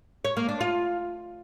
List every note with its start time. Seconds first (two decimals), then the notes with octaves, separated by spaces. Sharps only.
0.25 C#5
0.37 A#3
0.49 D4
0.61 F4